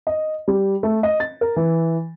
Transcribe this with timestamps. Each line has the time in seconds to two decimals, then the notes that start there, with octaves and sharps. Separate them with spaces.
0.07 D#5
0.48 G3
0.83 A3
1.03 D#5
1.20 A6
1.41 A#4
1.56 E3